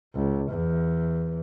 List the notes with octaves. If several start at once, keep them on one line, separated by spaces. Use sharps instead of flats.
C#2
E2